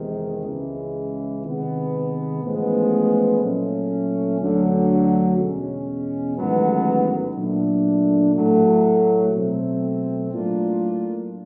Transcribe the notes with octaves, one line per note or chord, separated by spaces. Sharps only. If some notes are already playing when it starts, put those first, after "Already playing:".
Already playing: E2 C3 D#3 G#3
C#2 C#3 E3 G#3
C3 D#3 G#3 B3
A1 A2 F3 G#3 B3
A#2 F#3 A3 C#4
D2 D3 F#3
E2 B2 G#3 C#4
A1 G#2 D#3 F#3 B3
A#2 F#3 A3 D4
A2 F#3 A3
B2 F#3 A3 C4
A2 F#3 A#3 D4 F4